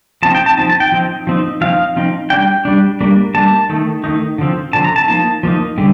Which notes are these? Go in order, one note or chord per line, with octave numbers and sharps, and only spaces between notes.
F3 C4 D#4 A5
G5
A5
F3 C4 D#4 A5
A5
G5
F3 C4 D#4
F3 C4 D#4
F3 C4 D#4 F5
F3 C4 D#4
G3 D4 G5
G3 D4
G3 A#3 D4
G3 A#3 D4 A5
D#3 A3 D#4
D#3 A3 D#4
D3 F3 C4
D3 F3 C4 A5
A#5
A5
F3 A#3 D#4 A5
F3 A#3 D#4
D3 G3